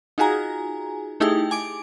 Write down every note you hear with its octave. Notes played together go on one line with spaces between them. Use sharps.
D#4 F4 F#4 G#4 G#5 A#5
A3 D#4 E4 G4 G#4 G5
G#5 D6 D7